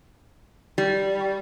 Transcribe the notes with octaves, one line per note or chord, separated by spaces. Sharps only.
G3